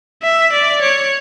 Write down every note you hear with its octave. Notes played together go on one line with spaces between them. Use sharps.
E5
D5
C#5